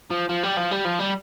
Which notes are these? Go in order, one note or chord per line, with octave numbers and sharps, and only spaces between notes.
F3
F3
G3
F3
G3
F3
G3